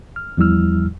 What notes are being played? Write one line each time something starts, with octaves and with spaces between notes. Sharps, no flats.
F6
E2 F3 G3 E4 E6 F6